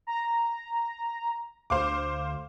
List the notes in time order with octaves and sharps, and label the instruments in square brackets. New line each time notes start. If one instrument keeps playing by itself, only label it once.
[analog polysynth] A#5
[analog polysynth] D2 [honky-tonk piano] C5 F5 D6